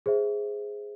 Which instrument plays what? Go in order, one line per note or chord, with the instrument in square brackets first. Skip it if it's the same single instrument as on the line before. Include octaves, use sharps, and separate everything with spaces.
[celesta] G#4 C5 E5